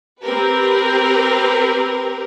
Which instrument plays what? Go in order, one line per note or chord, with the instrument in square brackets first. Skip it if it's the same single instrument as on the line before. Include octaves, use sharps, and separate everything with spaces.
[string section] C4 G4 A#4 B4